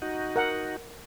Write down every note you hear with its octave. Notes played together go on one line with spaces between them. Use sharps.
D#4 F#4
A#4 F#5